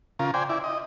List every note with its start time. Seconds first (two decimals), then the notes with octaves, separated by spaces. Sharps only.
0.19 C#3 F4 A#4
0.34 C5 D5 G5 G#5
0.49 E4 D5
0.64 D#5